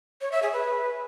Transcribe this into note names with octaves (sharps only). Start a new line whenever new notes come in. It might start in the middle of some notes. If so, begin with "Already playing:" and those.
C#5
E5
G#4
B4